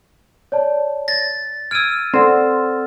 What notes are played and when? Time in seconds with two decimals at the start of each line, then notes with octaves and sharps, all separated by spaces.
0.52 C#5 D5 A5
1.08 A6 A#6
1.71 E6 F6 G#6 D7 D#7
2.14 C4 A4 D5 F#5